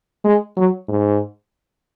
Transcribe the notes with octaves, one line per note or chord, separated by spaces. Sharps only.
G#3
F#3
G#2